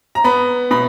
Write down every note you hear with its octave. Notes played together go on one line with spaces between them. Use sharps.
A#5
B3 B5
B2 B5